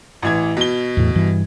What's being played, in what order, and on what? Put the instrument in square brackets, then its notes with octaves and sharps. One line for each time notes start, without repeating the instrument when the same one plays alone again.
[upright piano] A1 E3 G#6
B2 G7
[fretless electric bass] E2 A2
G2 E3